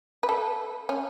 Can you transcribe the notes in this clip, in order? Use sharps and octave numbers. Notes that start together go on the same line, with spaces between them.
B4
A4
C#4